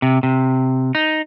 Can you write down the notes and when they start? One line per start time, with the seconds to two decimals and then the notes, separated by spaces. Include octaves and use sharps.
0.02 C3
0.23 C3
0.95 D#4